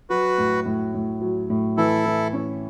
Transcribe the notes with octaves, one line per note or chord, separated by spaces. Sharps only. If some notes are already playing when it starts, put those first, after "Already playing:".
F#3 F#4 B4
A2
A2
A2
F#3
A2
E3 E4 A4
E3
C#4